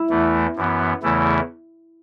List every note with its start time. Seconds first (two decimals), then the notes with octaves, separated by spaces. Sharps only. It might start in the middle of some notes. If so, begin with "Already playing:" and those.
Already playing: E4
0.10 E2 E3 A3
0.56 F#2 E3 B3
1.02 E2 C#3 E3 A3 E4